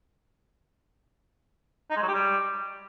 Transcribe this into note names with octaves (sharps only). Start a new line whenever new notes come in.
D#4
G#3
F#3
G4
G3